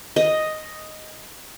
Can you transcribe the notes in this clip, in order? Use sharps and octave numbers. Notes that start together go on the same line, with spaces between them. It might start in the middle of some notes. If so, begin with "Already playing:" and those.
D#5